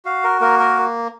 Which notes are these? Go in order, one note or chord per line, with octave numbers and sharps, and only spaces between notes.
F#4 F5
A#4
A#3 A#4
A#4